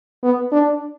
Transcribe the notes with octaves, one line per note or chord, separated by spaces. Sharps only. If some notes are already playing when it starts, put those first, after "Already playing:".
B3
D4